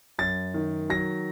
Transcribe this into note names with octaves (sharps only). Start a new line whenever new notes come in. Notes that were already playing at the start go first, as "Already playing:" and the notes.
F#2 A6
D#3
F#3 A#6